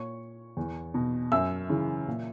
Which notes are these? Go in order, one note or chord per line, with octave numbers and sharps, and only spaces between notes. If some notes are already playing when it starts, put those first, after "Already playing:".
Already playing: A#2 C#5 C#6
E2
B2
F#2 E5 E6
C#3 E3
A#2